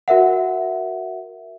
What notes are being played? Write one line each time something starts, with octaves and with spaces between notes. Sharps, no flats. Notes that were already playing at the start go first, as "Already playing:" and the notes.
F#4 A#4 E5 F#5